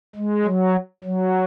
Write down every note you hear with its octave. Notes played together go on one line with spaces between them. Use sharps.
G#3
F#3
F#3